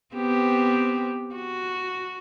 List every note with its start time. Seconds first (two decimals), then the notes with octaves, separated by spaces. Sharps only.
0.14 B3 C4 G4
1.35 F#4